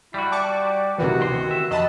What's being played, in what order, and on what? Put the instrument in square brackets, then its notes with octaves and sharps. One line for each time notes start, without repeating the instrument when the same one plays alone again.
[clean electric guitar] G3 F#4 [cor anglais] E4
[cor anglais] D5 [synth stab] A5 C#6 D6
[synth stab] C3 D#3 E3 [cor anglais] F#4
[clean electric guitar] D2 C4 C6
E5
[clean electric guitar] F2 C3 F#3 [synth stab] D#5 A5 B5